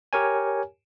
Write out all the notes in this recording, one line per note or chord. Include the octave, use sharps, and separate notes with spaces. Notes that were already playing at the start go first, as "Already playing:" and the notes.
G4 A#4 C#5 G#5